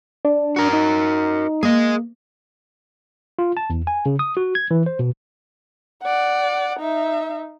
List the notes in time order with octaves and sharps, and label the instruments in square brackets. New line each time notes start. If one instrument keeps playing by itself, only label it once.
[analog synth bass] D4
[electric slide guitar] F#4 A#4
[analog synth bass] D#4
[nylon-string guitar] A#3 [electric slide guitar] G#4 D#5
[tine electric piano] F4
A5
E2
G#5
C#3
D#6
F#4
G#6
E3
C5
B2
[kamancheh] D5 F#5
D#4 E5